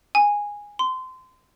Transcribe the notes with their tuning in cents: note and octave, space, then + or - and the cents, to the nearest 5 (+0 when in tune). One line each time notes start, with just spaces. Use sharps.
G#5 -10
C6 -25